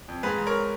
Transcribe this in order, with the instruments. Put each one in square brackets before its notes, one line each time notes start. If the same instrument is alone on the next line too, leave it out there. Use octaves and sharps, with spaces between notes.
[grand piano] F2
G#2 G#4 B4
G#2
A#4 C#5